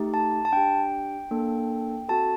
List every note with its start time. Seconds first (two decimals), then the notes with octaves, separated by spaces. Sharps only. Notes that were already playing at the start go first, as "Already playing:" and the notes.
Already playing: A3 D#4 G4
0.14 A5
0.45 A5
0.53 D4 G4 G5
1.31 A#3 D4 A4
2.09 C4 F#4 A4 A5